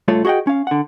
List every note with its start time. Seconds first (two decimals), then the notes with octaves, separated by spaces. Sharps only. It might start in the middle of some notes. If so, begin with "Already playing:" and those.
0.08 C#2 G2 A3 F4 C#5
0.25 F#4 G#4 D#5 F#5 G5
0.47 C#4 F5
0.67 D3 F#5